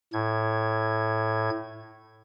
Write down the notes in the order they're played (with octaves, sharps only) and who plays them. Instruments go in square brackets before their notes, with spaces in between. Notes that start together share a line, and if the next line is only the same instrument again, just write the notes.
[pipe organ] A2 G#6